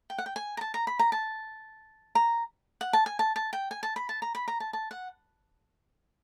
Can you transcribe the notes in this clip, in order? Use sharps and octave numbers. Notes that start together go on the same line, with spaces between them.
G5
F#5
G5
G#5
A#5
A5
A#5
B5
A#5
A5
A#5
F#5
A5
G#5
A5
A5
G5
G#5
A5
B5
A5
A#5
B5
A#5
A5
A5
F#5